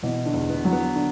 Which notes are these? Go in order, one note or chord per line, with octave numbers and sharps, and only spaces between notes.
B2 E3 E4
D3 D4
E2
B3
F#3
B3
D3 D4